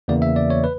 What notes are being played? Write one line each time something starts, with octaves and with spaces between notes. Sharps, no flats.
E2 C#3 E3 A#3 D5
E5
D5
C#5
B4